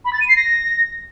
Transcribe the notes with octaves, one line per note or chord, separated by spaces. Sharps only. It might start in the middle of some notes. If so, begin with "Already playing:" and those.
B5
A6
D#7
C7
A#6